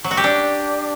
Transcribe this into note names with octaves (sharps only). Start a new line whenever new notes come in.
F#3
F#4
G4
D4